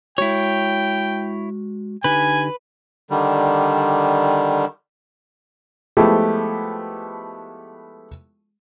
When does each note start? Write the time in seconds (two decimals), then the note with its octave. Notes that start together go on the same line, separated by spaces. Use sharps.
0.18 G#3 E4 F#4 C#5 G5
2.04 D3 D#4 G4 B4 G#5
3.10 D3 D#3 G3
5.97 F3 G#3 A3 B3 E4 G4